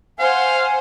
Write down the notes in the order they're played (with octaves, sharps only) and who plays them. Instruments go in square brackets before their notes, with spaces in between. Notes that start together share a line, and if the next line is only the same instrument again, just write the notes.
[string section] C5 F#5 [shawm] F5 [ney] G#5